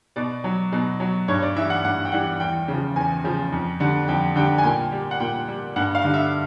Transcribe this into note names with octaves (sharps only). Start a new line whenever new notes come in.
B2 D5
F#3
B2
F#3
G2 C#5
D5
E3 G3 E5
F#5
G2 F#5
G5
E3 G3 F#5
E2 G5
C#3 F3
E2 G#5
C#3 F3
F2
D3 G3
F2 G5
D3 G3 G5
G#5
A#2 G5
G3
F#5
A#2 G5
G3
G2 F#5
F5
D3 G3
E5